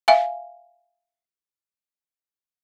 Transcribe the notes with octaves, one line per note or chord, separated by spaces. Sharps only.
E5 F5 G#5